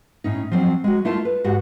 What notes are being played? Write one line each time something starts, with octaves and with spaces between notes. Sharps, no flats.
A2 C#4 D#4
F3 F#3 C4
G#3 F#4
A3 E4 F4 A#4 E5 A5
B4
G#2 F#4 G4 F#5